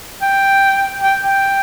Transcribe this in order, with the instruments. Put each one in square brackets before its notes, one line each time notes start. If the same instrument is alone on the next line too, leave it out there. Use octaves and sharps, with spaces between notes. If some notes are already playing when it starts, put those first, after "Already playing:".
[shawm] G5
G5
G5